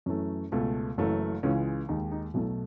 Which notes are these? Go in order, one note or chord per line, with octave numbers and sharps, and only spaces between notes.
F#2 E3 A3 C#4
C#2 B2 A3
F#1 F#2 E3 A3
C#2 C#3 E3 G#3 C#4
D#2 D#3 G#3 D#4
D#4
B1 B2 F#3 A3 E4